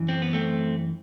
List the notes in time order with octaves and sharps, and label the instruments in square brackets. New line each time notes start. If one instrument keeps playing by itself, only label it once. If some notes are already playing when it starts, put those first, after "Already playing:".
Already playing: [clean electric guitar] F#2 E3
C4
B3
A3 C4